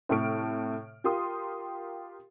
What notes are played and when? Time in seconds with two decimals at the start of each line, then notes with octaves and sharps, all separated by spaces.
0.09 A2 C3 A3 C#6 F6 D7
1.04 F4 G4 A#4 C6 D#6